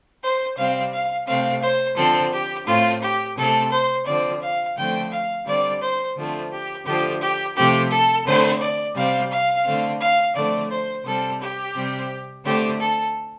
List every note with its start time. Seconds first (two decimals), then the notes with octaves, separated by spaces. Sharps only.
0.22 C5
0.56 C3 G3 C4 F5
0.92 F5
1.26 C3 A3 C4 F5
1.62 C5
1.96 D3 F3 C4 A4
2.32 G4
2.66 A2 A3 C4 F4
3.01 G4
3.36 C3 A3 C4 A4
3.71 C5
4.06 D3 F3 C4 D5
4.41 F5
4.76 D3 F3 A3 C4 G5
5.10 F5
5.46 D3 G3 C4 D5
5.81 C5
6.16 D3 F3 A3 C4
6.50 G4
6.85 D3 F3 A3 G4
7.21 G4
7.55 C3 F3 A3 C4 G4
7.90 A4
8.26 D3 A3 C4 C5
8.60 D5
8.95 C3 G3 C4 F5
9.30 F5
9.65 D3 A3 C4
10.00 F5
10.34 D3 F3 A3 C4 D5
10.70 C5
11.05 C3 G3 C4 A4
11.40 G4
11.75 C3 G3 C4
12.44 D3 A3 C4 G4
12.79 A4